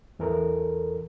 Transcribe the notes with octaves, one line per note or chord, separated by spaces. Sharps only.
E2 E3 A4 A#4